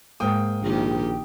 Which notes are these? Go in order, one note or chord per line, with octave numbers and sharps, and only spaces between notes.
G#2 A#3 G5 D#6
A#1 A#2 D#3 G4